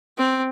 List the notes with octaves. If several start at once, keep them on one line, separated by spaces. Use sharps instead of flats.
C4